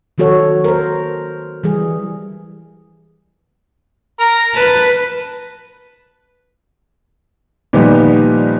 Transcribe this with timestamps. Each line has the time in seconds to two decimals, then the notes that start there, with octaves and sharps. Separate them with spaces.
0.18 D#3 F#3 F#4 A4 C#5
0.64 A#4 C5
1.64 E3 G3 G#4
4.20 A#4 A#5
4.55 B4 A5
7.73 A#2 D#3 F3 G3 B3 G4